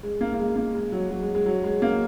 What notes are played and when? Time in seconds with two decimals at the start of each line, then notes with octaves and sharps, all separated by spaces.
0.03 G#3
0.21 A#3
0.33 A#3
0.39 G#3
0.56 A#3
0.75 G#3
0.92 F#3
1.10 F#3
1.23 G#3
1.35 G#3
1.46 F#3
1.64 G#3
1.82 A#3